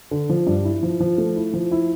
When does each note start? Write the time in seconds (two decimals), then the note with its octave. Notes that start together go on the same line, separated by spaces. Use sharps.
0.11 D3
0.29 F3
0.47 G2
0.64 E4
0.83 F3
1.00 F3
1.18 A3
1.36 E4
1.54 F3
1.72 E4